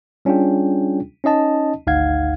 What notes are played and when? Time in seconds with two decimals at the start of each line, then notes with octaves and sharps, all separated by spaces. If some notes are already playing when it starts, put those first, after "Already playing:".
0.25 G3 C#4 D4 F4 G#4 G5
1.24 C#4 D#4 D#5 A5
1.87 G#1 D2 D#4 F5 F#5 G#6